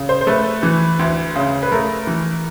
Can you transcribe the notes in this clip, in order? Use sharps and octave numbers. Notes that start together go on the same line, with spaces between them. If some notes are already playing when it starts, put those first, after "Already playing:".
Already playing: C#3
C5
C5
A3 B4
E3
D2
C#3
B4
A3 A#4
E3